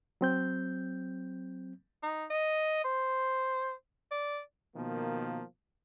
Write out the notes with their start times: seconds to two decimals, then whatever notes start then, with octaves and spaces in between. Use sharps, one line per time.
0.21 F#3 C4 G6
2.03 D#4
2.30 D#5
2.84 C5
4.11 D5
4.76 B2 D#3 F3 A#3